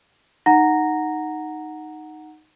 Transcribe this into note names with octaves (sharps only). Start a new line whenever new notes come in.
D#4 F#5 A#5 A#6